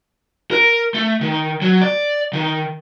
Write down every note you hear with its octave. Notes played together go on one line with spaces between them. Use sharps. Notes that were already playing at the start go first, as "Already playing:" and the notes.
A#4
A3
D#3
F#3
D5
D#3